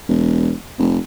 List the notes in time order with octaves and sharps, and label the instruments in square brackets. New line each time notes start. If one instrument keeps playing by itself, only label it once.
[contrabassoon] E1
F1